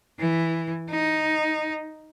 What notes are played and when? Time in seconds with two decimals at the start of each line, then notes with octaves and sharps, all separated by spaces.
0.19 E3
0.90 D#4